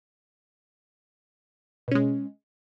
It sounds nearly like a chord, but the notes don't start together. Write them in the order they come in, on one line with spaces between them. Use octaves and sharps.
B2 C#4 G#3